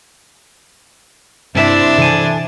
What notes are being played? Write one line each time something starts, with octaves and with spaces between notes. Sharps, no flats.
G2 C3 D4 E4 C5 E5
C3 E3 A4 G#5